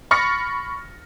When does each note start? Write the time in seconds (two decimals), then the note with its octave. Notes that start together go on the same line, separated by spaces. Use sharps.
0.11 B5 C#6 F6 A6 A#6 C#7